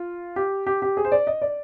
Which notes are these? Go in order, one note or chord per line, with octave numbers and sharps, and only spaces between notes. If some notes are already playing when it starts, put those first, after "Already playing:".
Already playing: F4
G4
G4
G4
G#4
C5
D5
D#5
D5